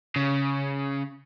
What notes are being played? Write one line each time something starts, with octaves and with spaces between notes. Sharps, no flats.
C#3